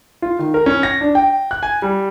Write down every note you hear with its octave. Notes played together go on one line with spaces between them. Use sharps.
F4
D#3
A#4
C#4
A#6
D4
G5
F#6
G#5
G3